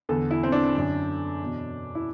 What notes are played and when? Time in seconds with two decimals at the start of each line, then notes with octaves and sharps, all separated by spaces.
0.09 E2 D3 A4
0.31 E4
0.43 C4
0.52 D4
0.75 F#2 D3
1.40 E2 B2
1.95 E4